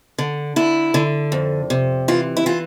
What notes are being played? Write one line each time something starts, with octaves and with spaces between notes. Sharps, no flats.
D3
D3 E4
D3
F2
C3
E3 F4
E4
E3 F4